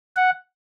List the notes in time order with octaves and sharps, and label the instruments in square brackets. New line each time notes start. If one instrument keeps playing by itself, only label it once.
[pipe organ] F#5